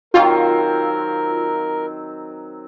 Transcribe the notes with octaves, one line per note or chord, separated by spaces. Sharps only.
D#3 F#3 C4 F4 A#4